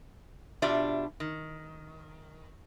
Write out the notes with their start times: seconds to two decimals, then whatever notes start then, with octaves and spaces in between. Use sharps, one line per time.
0.62 B2 D4 F4 G4 D5 E5
1.20 D#3